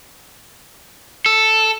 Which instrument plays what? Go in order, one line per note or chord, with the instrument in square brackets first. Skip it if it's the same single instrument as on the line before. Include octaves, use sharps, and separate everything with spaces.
[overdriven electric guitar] A4